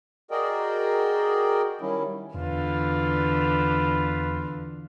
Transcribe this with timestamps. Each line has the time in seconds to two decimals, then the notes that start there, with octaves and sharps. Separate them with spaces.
0.31 F#4 G#4 A#4 D5 D#5 G5
1.81 D#3 F#3 G3 C#4 E4
2.34 E2 D3 E3 F4 B4